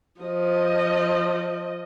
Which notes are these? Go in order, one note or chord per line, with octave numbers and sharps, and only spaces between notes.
F3 D#5